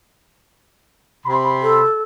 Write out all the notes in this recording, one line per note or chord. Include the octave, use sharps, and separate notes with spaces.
C3 B5 C6
A4